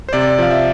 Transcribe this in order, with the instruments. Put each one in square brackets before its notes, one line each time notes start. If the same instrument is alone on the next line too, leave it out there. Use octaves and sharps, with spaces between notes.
[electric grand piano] C5
C3 D5
F3 F5
E5